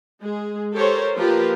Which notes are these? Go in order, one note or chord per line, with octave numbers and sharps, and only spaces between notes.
G#3 G#4
G4 A4 A#4 C5 C#5
F3 A#3 F4 G4 A#4 B4